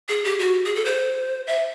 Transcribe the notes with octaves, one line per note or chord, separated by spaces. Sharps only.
G#4
G4
F#4
G#4
A4
C5
E5